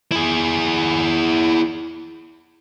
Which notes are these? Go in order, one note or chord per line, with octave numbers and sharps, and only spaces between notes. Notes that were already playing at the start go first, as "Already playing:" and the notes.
E4 G#4